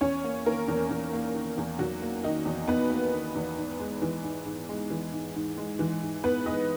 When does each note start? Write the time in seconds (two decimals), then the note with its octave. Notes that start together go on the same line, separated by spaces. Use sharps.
0.01 E2 C#4 C#5
0.24 A#3
0.46 D#3 A#3 A#4
0.68 E2
0.90 E2
1.13 A#3
1.35 D#3
1.57 E2
1.79 E2 F#3 F#4
2.02 A#3
2.24 D#3 D#4
2.45 E2
2.68 E2 B3 B4
2.90 A#3
3.13 D#3
3.35 E2
3.57 G#2
3.79 G#3
4.02 E3
4.23 G#2
4.45 G#2
4.69 G#3
4.90 E3
5.12 G#2
5.35 G#2
5.57 G#3
5.79 E3
6.02 G#2
6.23 G#2 B3 B4
6.46 G#3 D#4 D#5